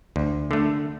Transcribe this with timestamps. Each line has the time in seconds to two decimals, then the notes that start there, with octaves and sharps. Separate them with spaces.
0.16 D2
0.51 D3 A3